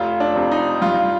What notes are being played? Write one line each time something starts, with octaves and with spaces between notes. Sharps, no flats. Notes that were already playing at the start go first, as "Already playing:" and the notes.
Already playing: F1 F4
D4
F2 C3
D#4
G2 F4